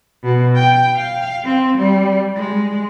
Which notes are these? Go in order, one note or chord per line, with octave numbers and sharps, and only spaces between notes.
B2
G5
F5
C4
G3
G#3